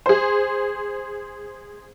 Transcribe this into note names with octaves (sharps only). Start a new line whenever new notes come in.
G#4 C5